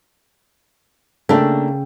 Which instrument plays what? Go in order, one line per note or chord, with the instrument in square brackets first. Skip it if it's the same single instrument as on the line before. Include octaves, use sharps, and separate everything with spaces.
[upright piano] C#3 C#4 G5 [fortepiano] A3 [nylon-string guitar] A#3 D4